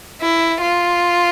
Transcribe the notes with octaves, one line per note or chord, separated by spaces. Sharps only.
E4
F4